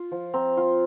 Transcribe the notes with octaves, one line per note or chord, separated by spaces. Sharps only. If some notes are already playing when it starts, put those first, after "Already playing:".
Already playing: F4
F3
C4 A#5
F4